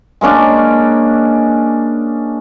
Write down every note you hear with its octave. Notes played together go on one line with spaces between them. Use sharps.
G#3 A#3 C#4 D4